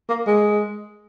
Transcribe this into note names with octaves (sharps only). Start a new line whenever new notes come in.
A#3
G#3